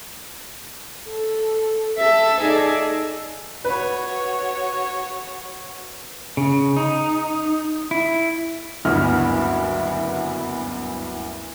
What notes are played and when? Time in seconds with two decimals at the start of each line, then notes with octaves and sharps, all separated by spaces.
1.08 A4
1.98 A4 E5
2.39 D#4 G#4 A4 D5
3.64 F#4 B4 C#5
6.37 C#3
6.77 D#4
7.91 E4
8.85 F#1 D2 G2 B3 E4 F6